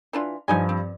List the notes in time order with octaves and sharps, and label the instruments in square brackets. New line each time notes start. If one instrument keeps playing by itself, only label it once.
[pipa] E3 D4 F4
[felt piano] G2 F3 [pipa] D#4 D#5 G#5
[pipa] C4